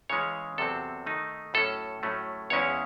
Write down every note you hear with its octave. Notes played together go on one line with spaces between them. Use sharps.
C#3 E3 G#3 C#4 C#5
E2 C3 F#3 C4 A4
D#3 A3 D#4
A2 F#3 C#4 A4
A2 F#3 A3 C#4
E2 C#3 G#3 C#4 E4 C#5